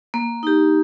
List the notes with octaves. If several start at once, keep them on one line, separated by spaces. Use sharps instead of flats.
A#3
D#4 G4